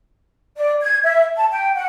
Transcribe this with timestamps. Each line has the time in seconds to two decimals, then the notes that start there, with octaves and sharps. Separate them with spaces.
0.56 D5
0.82 G#6
1.03 E5
1.35 A5
1.51 G5
1.75 F#5